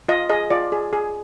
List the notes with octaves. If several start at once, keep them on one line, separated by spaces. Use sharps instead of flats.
F4 D#5
G#4 D#5
F4 D5
G#4
G#4